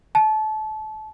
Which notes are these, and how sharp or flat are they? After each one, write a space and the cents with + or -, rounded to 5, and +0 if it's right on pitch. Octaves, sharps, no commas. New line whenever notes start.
A5 -30